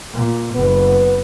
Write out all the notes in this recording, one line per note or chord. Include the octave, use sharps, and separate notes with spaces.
A#2
F#1 B3